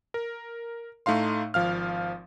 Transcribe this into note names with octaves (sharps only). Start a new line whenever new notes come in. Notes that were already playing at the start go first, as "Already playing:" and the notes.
A#4
A2 A3 D#4 F5 C6
G#1 F3 F5 F6